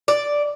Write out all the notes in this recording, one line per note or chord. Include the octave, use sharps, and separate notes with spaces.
D5